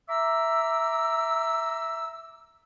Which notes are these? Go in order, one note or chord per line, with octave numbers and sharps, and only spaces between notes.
E5 A#5 D6 E6